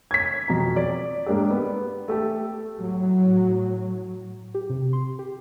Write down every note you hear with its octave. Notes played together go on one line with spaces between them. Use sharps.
G#6 B6
F2 B2 A#5
D5
G#2 A#3 D4 G4
B3
A3 G4 A4
A2 F#3
G4
C3
C6
G4